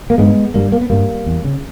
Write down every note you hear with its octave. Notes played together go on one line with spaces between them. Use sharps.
A#3
G2 G#3 B3
G2 G3 A#3
A#3
B3
G2 G3 A#3
E2
C#3